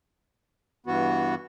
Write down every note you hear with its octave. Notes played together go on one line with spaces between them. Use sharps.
G2 E3 B3 F#4